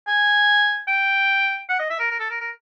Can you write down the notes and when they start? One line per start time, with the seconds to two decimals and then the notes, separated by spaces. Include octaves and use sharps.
0.08 G#5
0.88 G5
1.69 F#5
1.79 D#5
1.90 E5
1.99 A#4
2.11 A#4
2.20 A4
2.30 A#4
2.41 A#4